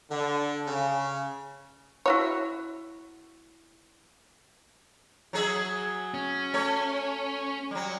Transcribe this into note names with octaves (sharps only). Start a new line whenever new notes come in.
D3
C#3
E4 F#4 C#5
F#3 G#4 E5
C#4
A3 C#5
F#3 G3